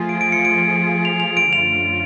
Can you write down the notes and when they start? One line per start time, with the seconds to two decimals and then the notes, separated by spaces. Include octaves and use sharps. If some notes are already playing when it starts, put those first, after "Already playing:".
Already playing: F3 A3 F4 G#4
0.09 D7
0.21 D7
0.32 C#7
0.45 D7
1.05 F7
1.20 F7
1.37 D7
1.52 F#2 D3 F3 A3 F4 F7